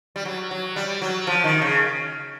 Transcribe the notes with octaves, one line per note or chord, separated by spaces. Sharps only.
G3
F#3
F#3
G3
F#3
F3
D#3
C#3